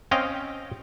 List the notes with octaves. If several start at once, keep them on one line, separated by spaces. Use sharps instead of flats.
C4 C#4 D#5 F5 G5